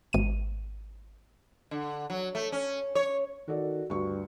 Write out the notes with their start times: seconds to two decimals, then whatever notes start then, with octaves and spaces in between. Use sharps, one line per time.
0.13 G#1 D#7
1.71 D3
2.10 F#3
2.35 A3
2.52 C#4
2.95 C#5
3.48 D#3 F#4 A4 D5
3.90 D2 G2 C#6